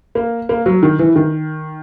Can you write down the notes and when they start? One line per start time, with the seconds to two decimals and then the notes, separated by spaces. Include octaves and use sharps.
0.15 A#3
0.49 A#3
0.66 F#3
0.83 D#3
0.99 E3
1.16 D#3